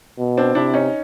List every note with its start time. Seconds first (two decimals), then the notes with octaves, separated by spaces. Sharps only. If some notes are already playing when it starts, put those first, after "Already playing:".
0.18 B2
0.38 C4 D4
0.55 C3 D4 E4
0.74 C#4 D#4